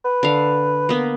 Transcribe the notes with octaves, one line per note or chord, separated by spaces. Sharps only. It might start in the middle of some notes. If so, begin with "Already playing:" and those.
B4
D3 F5
A#3 B3